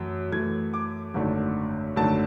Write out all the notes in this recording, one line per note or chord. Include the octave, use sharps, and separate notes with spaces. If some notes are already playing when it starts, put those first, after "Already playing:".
Already playing: F#2 E3 A3
F#2 E3 A3 G#6
D6
G#1 F#2 D3 A3 D4
G#1 F#2 D3 A3 D4 A5